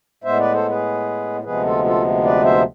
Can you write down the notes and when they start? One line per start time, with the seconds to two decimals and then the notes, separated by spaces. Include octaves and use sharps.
0.24 A2 G#3 B3 C5 E5
0.39 B4 D5
0.53 A4 C5
0.69 G#4 B4
1.44 D2 C3 F3 G#3 B3 G#4 B4
1.64 F4 A4
1.84 F4 A4
2.24 B4 D5
2.44 C5 E5